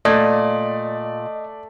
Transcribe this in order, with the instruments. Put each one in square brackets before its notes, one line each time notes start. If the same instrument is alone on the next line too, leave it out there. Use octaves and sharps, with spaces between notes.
[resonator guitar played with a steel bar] A#2 [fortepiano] A3 [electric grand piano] D5 [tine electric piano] D#5